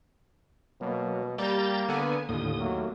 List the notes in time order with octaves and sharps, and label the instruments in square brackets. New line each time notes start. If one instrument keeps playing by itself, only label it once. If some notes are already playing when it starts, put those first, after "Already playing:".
[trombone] B2 [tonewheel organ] F#3 A#3
[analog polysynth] G3 [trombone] A#3 [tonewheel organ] A#5 G6 A6
[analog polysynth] D3 B3 [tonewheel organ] G#5
[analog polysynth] D#2 [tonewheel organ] A2 D3 D#6
[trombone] F#3 [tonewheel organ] A3 A#3